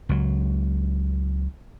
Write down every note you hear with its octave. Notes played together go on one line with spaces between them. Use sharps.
C#2 F#3